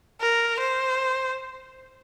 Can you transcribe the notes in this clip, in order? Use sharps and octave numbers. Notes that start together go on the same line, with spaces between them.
A#4
C5